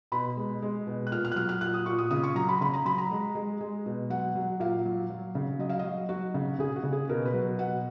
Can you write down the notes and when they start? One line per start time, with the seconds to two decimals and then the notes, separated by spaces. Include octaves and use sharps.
0.12 B2 B5
0.37 G#3
0.62 G#3
0.87 B2
1.07 F#6
1.12 A#2 F6
1.25 F6
1.32 F#6
1.36 F#3 F6
1.49 F6
1.61 A#2 F#6
1.74 D#6
1.86 A#2 C#6
1.98 D#6
2.11 C#3 D#6
2.23 C#6
2.35 F#3 A#5
2.49 B5
2.61 C#3 B5
2.74 A#5
2.86 F#3 B5
2.98 A#5
3.11 G#3
3.35 G#3
3.61 G#3
3.86 B2
4.10 F#3 F#5
4.35 F#3
4.60 A#2 F5
4.86 F#3
5.10 F#3
5.35 C#3
5.59 F#3 D#5
5.69 F5
5.79 F#3 D#5
6.09 F#3 F#4
6.34 C#3
6.59 C#3 G#4
6.76 F#4
6.84 C#3
6.93 G#4
7.09 B2 A#4
7.25 B4
7.34 F#3
7.59 B2 F#5